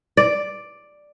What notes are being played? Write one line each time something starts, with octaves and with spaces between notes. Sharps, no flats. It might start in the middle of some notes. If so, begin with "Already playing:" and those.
D5